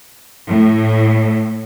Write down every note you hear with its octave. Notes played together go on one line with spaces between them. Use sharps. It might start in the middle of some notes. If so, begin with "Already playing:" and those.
A2